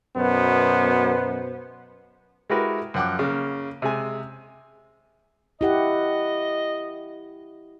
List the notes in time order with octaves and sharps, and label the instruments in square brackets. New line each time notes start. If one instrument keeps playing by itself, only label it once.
[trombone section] F#2 B2 B3 C5
[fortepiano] G#3 E4 F#4 G4 A#4 B4
F#2 F3 F#5 G5 D6
C#3 A#3
C3 G#3 G#5
[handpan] E4 G4 F#5 [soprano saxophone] D#5